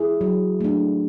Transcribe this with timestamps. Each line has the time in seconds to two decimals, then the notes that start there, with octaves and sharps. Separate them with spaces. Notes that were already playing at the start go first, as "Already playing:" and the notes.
Already playing: E4 G#4
0.21 F#3
0.60 A3 D4